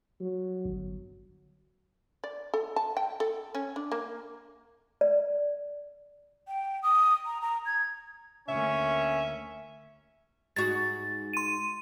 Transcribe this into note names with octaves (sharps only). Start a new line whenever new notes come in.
F#3
G1
D5
A4
A5
G5
A4
C#4
D4
A#3
D5
G5
D#6
A#5
A#5
G#6
D2 A#3 C#4 E5
G#2 F#4 A6
C6 D#7